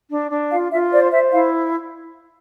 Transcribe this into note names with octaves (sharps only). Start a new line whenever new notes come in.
D4
D4
F4 F5
F4 E5
C5 D5
C5 E5
E4 F5